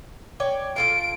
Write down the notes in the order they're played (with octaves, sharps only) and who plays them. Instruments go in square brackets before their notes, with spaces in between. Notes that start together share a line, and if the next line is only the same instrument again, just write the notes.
[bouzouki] C#5 D5 G5
[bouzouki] F4 A4 F5 [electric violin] D7